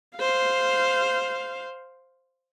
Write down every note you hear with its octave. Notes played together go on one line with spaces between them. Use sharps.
C5 F5